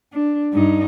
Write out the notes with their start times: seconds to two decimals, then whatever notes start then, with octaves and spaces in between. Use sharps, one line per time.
0.13 D4
0.53 G2 D#4